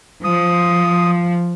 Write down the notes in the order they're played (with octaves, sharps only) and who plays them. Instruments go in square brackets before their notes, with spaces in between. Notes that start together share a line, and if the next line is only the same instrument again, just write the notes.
[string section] F3 [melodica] D#6